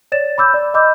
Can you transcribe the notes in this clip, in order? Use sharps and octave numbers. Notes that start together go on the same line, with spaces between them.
C#5 D5 A6 E7
B5 D6 E6 G6
D5
D#5 B5 D6 E6 G6